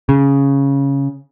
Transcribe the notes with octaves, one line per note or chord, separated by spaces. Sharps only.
C#3